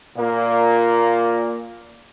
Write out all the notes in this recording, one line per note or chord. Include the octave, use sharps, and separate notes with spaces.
A#2 A#3